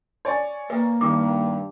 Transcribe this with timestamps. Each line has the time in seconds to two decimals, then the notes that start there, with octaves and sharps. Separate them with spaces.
0.25 C#5 D5 G#5
0.70 A#3 B4
1.01 G2 D#3 D6